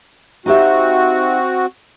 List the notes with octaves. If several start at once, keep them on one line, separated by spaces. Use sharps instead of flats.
C4 D#4 F#4 G4 E5